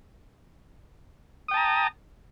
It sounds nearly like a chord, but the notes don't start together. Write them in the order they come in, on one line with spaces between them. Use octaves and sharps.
D#6 G5 A5 A#5